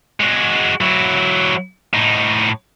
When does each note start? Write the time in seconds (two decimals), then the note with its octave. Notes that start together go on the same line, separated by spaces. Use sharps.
0.20 G#3 F#4
0.81 F#3 E4
1.94 A2 D#4